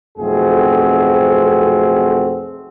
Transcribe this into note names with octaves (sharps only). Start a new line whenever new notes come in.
B1 F2 A3 C4 F#4 G#4